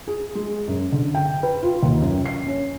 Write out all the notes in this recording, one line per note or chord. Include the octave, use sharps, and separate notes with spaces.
G#4
G#3
F#2
D3
G5
B4
F4
D#2
F#2
C7
C#4